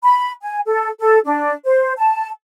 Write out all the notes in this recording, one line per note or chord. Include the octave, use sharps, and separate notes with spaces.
B5
G#5
A4
A4
D4
C5
A5